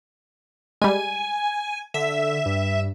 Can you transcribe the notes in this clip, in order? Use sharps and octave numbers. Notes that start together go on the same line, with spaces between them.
G3 G#3 G#5
D3 E5
G2